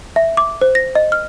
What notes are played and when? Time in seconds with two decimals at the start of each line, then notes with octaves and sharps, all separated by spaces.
0.16 E5
0.37 D6
0.61 C5
0.75 A#6
0.95 D#5
1.12 F6